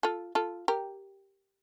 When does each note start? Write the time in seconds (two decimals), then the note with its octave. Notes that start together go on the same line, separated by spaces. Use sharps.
0.03 F4 A4
0.35 F4 A4
0.68 G4 A#4